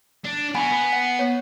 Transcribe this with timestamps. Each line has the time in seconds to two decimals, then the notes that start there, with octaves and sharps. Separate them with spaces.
0.24 D4
0.55 B3 F#4 F#5 G#5 B5
0.72 B3
0.93 F#5
1.19 C#5